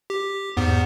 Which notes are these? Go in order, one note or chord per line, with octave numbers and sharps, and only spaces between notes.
G4
E2 G#2 B3